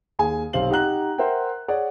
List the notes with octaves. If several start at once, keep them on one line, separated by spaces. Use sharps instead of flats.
D#2 G#4 G#5
B1 C3 C4 F5 F#7
D#4 G4 F#5 A#5 F#6 F#7
A#4 C5 E5 F#5 G5
G#4 C#5 D5 F#5